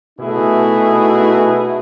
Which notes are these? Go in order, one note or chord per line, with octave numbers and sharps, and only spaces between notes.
B2 A3 D#4 E4 F#4 G#4